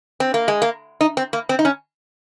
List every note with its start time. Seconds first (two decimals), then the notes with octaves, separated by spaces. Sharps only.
0.20 C4
0.34 A#3
0.48 G#3
0.62 A#3
1.01 D#4
1.17 C4
1.33 A#3
1.49 C4
1.59 D#4
1.65 C#4